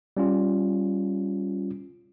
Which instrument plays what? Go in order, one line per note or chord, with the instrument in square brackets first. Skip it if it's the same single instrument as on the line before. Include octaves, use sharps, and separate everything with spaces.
[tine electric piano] G3 C#4 F4